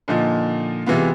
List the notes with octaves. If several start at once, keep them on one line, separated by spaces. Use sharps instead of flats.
A#2 D3 F3 D#4 F4
C3 E3 G#3 B3 F4